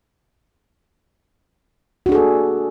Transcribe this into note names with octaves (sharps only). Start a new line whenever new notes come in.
A#3 D4 F#4 G#4 A4